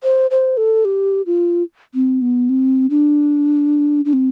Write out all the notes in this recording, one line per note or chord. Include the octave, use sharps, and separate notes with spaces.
C5
C5
A4
G4
F4
C4
B3
C4
D4
D4
C4